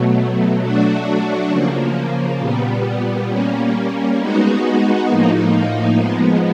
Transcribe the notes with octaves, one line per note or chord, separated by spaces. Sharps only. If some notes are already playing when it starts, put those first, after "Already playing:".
Already playing: B2 F#3 A3
F#3 A3 D4 F#4
C#3 F3 A#3
A#2 G3 B3
G3 A#3 C#4
G#3 B3 D#4 F#4
A2 F3 A#3 D#4
F3 G#3 B3